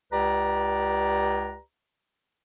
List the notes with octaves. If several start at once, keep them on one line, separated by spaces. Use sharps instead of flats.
C#2 G4 B4 D5 A#5